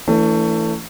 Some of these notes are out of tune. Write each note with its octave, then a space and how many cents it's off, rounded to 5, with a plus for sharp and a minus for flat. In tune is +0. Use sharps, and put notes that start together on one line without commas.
E3 +0 A3 +25 D4 -45